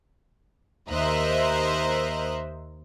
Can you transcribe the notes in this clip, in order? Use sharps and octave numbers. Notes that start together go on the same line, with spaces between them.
D#2 A#4 C5 D#5 E5 F#6